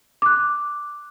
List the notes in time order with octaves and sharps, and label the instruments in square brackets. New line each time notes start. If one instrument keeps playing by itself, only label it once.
[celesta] D6 F#6